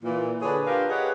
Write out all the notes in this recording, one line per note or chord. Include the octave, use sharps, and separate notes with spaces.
A#2 E3
D3 D4 G#4 B4 C#5 D5
D4 F4 G4 A#4 B4 F5
G4 G#4 B4 C#5 D#5 F#5